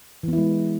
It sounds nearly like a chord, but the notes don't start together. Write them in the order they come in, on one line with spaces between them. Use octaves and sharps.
E3 B3 E4 G#3